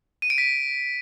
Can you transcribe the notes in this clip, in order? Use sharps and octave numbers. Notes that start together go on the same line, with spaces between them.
D#7
D7
B6